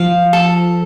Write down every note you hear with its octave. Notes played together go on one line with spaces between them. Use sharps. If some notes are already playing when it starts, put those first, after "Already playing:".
Already playing: F3 F5
A4